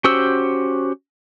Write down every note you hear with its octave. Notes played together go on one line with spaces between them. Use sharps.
C#4 F#4 G4 C5 E6